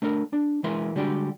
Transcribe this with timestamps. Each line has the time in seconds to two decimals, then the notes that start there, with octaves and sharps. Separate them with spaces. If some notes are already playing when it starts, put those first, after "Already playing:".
0.02 A3 D4 A4 A#4
0.33 D4
0.64 E3 G#3 E4 A#4 E5 C6
0.95 D3 G3 G#3 D4 F#4 G4